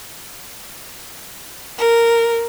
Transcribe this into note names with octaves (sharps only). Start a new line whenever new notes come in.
A#4